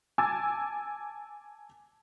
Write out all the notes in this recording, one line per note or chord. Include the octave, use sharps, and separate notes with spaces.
G#5 A5 D6 E6 G#6 A6